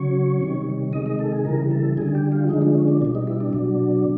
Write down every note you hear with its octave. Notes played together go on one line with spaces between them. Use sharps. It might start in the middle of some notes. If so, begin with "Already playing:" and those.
Already playing: C#3 F#3 C#5
C3 D#3 G3
C3 D#3 G#3 D#5
D#5
A4
G#4
C#3 E3 G3 A#4
A4
D3 G3 G#4
G4
F4
D3 F3 G#3 D#4
D4
C#4
D4
B2 G3 D4
D#4
E4
D4
B2 F#3